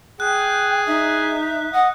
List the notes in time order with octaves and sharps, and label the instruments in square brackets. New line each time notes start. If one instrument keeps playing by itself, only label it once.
[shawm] G#4 [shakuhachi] G5 [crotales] F#6
[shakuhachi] D#4 [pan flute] E5
[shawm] D#5 [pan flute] F#5